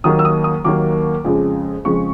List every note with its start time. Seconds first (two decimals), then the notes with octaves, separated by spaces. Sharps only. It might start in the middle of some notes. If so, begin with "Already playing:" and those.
0.04 D#2 D#3 F#3 A#3 D#6
0.19 E6
0.25 D#6
0.44 D#6
0.64 D#2 D#3 F#3 A#3 D6
1.25 F2 C#3 F3 G#3
1.85 F2 C#3 F3 G#3 C#6